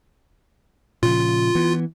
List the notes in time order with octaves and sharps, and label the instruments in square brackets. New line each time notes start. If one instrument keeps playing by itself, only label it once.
[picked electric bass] A#2 C#3 F3 [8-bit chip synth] F4
[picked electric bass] E3 B3